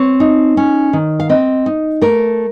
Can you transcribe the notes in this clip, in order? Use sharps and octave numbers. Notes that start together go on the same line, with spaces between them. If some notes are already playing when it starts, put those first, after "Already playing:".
Already playing: C4 C#5
D#4
C#4
D#3
F5
C4 D#5
D#4
A3 A#4